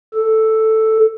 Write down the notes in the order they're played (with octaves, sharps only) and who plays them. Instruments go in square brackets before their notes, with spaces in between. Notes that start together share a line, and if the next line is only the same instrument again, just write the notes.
[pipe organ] A4